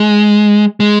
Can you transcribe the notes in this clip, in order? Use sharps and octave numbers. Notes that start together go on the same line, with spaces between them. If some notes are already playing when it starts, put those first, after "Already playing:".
Already playing: G#3
G#3